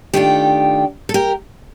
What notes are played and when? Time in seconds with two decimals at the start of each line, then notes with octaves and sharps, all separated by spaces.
0.14 D#3 A3 D4 F4 G4
1.09 A4
1.14 G4 A#4